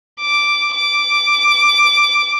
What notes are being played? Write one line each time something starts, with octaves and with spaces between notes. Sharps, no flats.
D6
D6